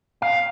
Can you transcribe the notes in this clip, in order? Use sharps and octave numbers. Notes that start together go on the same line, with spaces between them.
F5